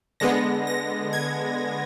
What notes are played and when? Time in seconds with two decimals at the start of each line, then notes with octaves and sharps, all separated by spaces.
0.20 D3 G#3 B3 A#6
0.67 A#6
1.13 G#6